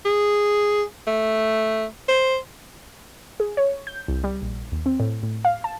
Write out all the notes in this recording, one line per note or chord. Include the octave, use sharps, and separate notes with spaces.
G#4
A3
C5
G#4
C#5
G6
C2
G3
A#1
D#2
C4
A2
A2
F5
A5